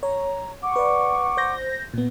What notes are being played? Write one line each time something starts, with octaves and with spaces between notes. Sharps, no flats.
C#5 A#5
F#5 C#6 D6
B4 D5
C5 G6 A#6
A#2 B3